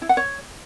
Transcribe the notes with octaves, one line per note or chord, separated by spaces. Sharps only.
E4
F#5
C#5